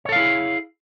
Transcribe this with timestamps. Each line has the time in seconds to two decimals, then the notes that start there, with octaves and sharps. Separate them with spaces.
0.05 C#5
0.09 A4
0.12 F5
0.16 E4
0.19 G#4